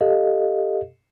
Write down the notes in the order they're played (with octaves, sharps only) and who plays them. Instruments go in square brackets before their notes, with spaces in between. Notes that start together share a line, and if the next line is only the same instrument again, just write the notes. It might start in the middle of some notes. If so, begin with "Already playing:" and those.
[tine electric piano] G4 A4 D#5 F5